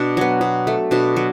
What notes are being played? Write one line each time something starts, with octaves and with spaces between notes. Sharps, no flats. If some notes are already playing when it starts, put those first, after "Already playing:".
Already playing: B2 D4
F#3 B3
B2
A3
B2 D4
F#3